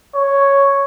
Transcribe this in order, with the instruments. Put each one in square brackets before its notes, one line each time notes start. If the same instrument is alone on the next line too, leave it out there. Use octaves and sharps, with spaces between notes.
[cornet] C#5